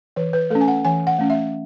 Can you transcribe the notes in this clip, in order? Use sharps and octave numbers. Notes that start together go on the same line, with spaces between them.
E3 B4
B4
A3 C#4 A4
G#5
F#5
E3 G#5
F#5
A3 C#4
E5